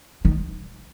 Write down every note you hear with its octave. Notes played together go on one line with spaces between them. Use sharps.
D#3